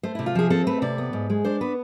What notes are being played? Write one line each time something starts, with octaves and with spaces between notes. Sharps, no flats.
A3 C5
E4
C3
F4
F3 G#4
C4 A4
A3 B4
C3 D5
B3
G#2
G#3
D4 C5
B3 B4